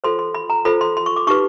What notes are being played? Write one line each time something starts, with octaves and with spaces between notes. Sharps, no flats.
F4 A4 C5 C6
C6
B5
A#5
F4 A4 C5 B5
C6
C6
C#6
D6
D#4 G4 B4 C#6